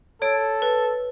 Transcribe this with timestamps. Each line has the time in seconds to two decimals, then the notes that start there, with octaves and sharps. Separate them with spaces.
0.22 A4 C#5 D7
0.62 B4